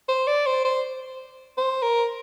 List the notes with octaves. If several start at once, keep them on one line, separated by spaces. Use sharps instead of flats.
C5
D5
C5
C5
C5
A#4